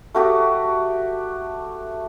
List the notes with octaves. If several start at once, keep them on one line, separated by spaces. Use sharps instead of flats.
A3 F#4 G4